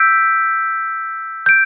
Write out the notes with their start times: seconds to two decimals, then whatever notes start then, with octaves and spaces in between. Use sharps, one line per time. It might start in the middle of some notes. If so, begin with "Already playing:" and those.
Already playing: E6 G6 B6 D7
1.46 G6 D7